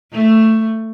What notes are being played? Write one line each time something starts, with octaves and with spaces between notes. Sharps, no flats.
A3